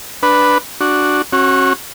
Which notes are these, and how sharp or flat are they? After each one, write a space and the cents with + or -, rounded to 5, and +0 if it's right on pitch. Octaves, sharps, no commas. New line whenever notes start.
D4 +0 B4 +0
D4 +0 F#4 +0
C#4 -30 F#4 +0